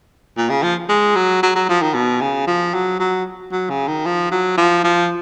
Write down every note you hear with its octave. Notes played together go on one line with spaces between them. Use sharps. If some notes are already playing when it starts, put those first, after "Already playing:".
A#2
C#3
F3
G#3
F#3
F#3
F#3
F3
D#3
B2
C#3
F3
F#3
F#3
F#3
C#3
D#3
F3
F#3
F3
F3